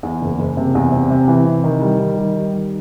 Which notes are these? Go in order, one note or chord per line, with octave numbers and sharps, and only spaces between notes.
E2
F#1
F#1
C3
E2
C3
C3
E3
C3
D#3
G3
D#3
G3
G3
D#3